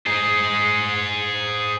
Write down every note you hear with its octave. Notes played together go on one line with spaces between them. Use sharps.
G#4 C5